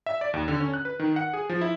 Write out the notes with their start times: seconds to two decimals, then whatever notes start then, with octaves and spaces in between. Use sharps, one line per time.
0.06 E5
0.21 D5
0.34 D#2
0.48 D3
0.60 C#4
0.74 F#6
0.85 B4
0.99 D#3
1.16 F#5
1.34 G#4
1.49 F3
1.61 E4